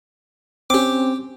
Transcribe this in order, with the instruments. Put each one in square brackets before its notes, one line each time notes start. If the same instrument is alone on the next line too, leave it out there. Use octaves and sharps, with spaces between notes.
[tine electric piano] C4 C#4 [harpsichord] G4 D6